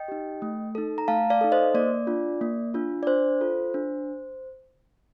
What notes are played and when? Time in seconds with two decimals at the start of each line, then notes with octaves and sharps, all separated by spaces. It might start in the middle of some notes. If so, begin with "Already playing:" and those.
Already playing: D#5 G5
0.08 D#4 G4
0.42 A3
0.75 D#4 A4
0.98 A#5
1.08 A3 F5 A5
1.30 D5 F5
1.41 D#4 A4
1.52 C5 D#5
1.74 A#3 D5
2.07 D4 F4
2.41 A#3
2.74 D4 F4
3.03 D5
3.07 D4 C5
3.41 F4 A4
3.74 D4